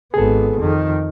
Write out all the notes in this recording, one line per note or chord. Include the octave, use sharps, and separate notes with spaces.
G#1 B3 G#4 A4
F2 D#3